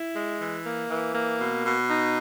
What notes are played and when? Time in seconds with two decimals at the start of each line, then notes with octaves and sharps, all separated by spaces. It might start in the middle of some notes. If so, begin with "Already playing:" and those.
Already playing: E4
0.15 G#3
0.39 E3
0.65 A#3
0.89 E3
1.14 A#3
1.40 B2
1.64 B2
1.89 D#4